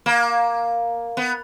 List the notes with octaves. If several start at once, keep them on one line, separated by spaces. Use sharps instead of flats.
A#3
B3